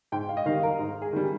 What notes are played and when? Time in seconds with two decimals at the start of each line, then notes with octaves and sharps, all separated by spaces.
0.12 G#2 G5
0.29 F5
0.37 D#5
0.46 D#3 G3 F5
0.63 A#4
0.79 G#2
1.02 G#4
1.13 D#3 G3